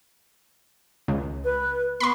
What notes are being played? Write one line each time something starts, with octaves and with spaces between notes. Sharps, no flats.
C#2
B4
B3 B5 C6